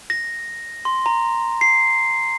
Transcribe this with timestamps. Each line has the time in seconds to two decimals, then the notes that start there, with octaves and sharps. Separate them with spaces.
0.10 A#6
0.85 C6
1.06 A#5
1.61 C7